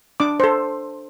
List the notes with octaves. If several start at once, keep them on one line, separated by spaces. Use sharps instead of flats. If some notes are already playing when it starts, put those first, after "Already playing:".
D4 D6
A4 C5